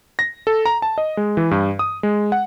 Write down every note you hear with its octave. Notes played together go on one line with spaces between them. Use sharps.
A#6
A4
A#5
A5
D#5
G#3
E3
G2
D#6
G#3
F#5